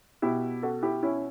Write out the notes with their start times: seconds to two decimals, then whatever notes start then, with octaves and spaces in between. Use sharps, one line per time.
0.22 B2 E4 G4
0.63 F#4 A4
0.82 E4 G4
1.03 C#4 E4